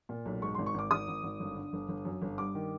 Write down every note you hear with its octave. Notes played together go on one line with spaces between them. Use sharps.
A#2
B1
G#2 C#6
C6
G#1
C#6
G#1 D6
G#1 D#6
G#1
G#1
G1
D3
G1
G1
F#2
G1
G2 D6
D#3